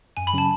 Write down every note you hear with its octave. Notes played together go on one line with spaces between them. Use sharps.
F#2 G#5
B5
C#3 F#3 C#4 A5